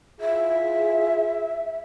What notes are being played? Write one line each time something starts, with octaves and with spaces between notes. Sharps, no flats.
E4 F4 G#4 E5